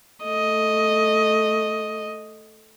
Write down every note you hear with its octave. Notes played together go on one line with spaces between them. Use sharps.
A3 D#5